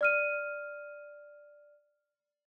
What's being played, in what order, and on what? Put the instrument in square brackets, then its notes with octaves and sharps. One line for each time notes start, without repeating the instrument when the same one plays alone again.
[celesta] D5 F6 D#7